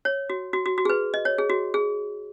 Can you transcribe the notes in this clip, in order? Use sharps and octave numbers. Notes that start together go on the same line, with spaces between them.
C#5
F#4
F#4
F#4
F#4
G#4
B4
D#5
C#5
G#4
F#4
G#4